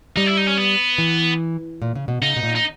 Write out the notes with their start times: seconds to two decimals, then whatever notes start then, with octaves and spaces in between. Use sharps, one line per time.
0.16 G3 D#4
0.26 E4
0.37 D#4
0.47 C#4
0.58 B3
0.98 E3
1.82 A#2
1.95 C#3
2.08 B2
2.22 C#3 D#4
2.37 B2
2.43 A#2
2.55 D#4